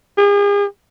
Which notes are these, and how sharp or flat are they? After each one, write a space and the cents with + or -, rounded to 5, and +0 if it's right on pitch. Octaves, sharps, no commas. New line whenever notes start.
G#4 -40